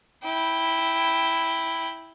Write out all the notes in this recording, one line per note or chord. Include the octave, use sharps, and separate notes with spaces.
E4 G5